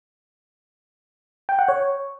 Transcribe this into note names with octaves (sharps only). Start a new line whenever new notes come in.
G5
F#5
C#5